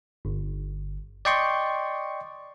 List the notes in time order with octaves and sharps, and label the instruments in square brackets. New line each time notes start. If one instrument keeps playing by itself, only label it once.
[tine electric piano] G1
D5 D#5 G5 C6 C#6